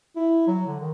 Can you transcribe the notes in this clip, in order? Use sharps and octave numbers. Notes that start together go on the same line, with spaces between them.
E4
F#3
D3
D#3